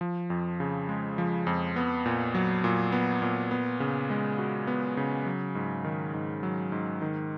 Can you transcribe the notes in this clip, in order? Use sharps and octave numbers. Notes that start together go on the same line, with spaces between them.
F3
F2
C#3
G#3
F3
F2
B3
A#2
F#3
A#2
B3
A#2
B3
C#3
G#3
F#4
B3
C#3
F#3
G#2
D#3
G#2
F#3
G#2
D#3